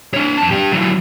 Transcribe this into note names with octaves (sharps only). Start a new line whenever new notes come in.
D4 C#5
F2 A5
D4 G4
E3 F#3